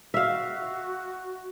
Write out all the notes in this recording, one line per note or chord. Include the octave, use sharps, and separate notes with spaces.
F#4 E5 F5